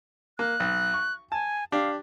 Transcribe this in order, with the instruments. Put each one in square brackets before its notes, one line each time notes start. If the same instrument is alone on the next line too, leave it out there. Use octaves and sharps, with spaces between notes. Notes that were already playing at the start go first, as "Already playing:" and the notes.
[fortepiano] A#3 [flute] F#6
[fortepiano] B1
C#6
[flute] G#5 [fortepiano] A5
[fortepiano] D4 G4 [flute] F5